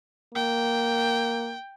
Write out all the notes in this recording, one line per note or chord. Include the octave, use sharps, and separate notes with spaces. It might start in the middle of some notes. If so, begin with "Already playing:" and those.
A#3 G5